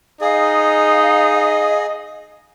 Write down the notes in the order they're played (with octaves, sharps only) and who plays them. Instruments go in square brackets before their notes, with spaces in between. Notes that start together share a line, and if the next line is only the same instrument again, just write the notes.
[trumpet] D#4 [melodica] G#4 [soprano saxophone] D#5 [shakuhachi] F5